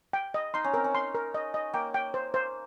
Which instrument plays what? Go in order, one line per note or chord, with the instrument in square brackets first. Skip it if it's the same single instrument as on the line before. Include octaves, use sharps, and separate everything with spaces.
[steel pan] G5
D#5
[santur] D#4 [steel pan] C6
[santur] C#4
[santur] C4 [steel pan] A#4
[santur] C#4
[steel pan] C6
A#4
D#5
D#5
[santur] A#3 [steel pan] G5
[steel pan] G5
C5
C5